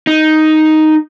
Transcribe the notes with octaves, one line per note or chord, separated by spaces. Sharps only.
D#4